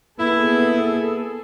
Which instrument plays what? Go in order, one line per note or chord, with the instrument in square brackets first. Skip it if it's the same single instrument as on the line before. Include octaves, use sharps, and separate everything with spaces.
[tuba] A#3 [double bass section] B3 [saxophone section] E4 [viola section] G#4 A4